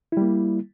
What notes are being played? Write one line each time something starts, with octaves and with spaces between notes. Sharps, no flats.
G3 A#3 E4